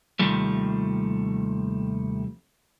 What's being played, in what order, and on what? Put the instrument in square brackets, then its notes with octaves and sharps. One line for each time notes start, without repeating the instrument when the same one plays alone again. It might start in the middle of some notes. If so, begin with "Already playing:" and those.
[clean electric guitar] D#2 C3 D#3 F3 G3 A3